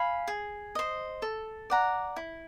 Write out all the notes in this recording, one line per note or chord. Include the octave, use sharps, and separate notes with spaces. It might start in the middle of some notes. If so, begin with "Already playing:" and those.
Already playing: F5 G#5 B5
G#4
C5 D#5
A4
D5 F#5 A#5
E4